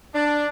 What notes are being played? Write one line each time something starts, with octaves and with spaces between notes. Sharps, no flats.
D4